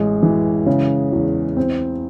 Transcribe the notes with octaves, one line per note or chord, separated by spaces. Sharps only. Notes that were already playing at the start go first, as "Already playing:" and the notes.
Already playing: A1 G#3
E3
C#3
E2
C4